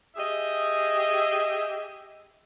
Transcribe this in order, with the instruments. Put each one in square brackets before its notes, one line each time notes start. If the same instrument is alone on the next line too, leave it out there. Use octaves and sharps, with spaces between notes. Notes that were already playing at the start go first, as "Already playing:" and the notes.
[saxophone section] G4 G#4 D#5 E5